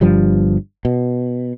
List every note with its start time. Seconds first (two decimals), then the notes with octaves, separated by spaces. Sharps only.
0.01 G1 G2 F3 G3
0.85 B2